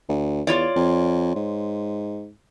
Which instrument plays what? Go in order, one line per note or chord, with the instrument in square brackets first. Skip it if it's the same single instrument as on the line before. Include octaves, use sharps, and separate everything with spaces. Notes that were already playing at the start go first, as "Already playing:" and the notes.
[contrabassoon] D2
[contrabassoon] E2 [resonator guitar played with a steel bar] F4 C#5 D5
[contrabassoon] F2
G#2